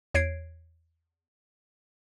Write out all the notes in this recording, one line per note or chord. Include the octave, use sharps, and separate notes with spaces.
E2 C#5 G#6 C7 D7